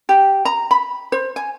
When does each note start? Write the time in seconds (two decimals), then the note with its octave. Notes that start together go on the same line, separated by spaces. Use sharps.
0.09 G4
0.45 A#5
0.71 B5
1.12 C5
1.36 G#5